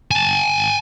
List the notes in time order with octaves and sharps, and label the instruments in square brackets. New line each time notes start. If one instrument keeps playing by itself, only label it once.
[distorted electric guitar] G#5 A5